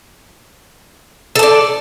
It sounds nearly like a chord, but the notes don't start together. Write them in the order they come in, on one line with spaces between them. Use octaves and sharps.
A4 A5 D5